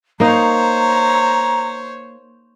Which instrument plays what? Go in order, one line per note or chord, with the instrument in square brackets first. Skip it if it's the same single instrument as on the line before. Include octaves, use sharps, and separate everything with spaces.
[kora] A#3 D#4 [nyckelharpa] C5 C#5 [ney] A#5